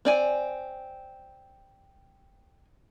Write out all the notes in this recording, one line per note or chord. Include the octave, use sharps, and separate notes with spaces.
C4 D5 G#5